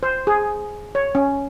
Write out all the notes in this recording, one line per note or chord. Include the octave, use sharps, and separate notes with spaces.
C5
G#4
C#5
C#4